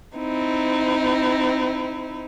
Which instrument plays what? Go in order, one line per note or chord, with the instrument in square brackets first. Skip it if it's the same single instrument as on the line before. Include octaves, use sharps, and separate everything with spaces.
[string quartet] C4 D#4 E4